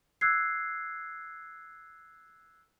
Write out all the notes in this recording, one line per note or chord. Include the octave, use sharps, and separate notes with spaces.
E6 F#6 G#6 C7